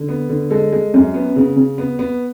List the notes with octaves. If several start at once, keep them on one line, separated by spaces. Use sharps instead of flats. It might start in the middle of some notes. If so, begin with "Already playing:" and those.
Already playing: D3
B3
D3
G#3 A4
G#3
F#2
B3
C#3
C#3
B3
B3